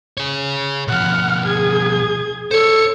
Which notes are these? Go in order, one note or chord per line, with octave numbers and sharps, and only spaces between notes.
G#4 C#5
B2 F3 F#5 F6
G#4 G#6
A4 C5 C#5 C#7